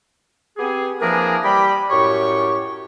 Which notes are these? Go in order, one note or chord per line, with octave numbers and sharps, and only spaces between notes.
B3 C4 G4 G#4
E3 F3 A#3 D4 G#4 A#4
G3 G4 B5
F#2 A2 G4 C#5 C#6